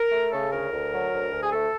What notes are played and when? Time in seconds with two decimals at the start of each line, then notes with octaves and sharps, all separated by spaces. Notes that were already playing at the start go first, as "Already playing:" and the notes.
Already playing: A#4
0.12 A3
0.32 C#3 A4
0.52 D2 A#4
0.73 D2
0.93 F#3
1.13 D2
1.32 D2
1.43 G#4
1.52 A3 A4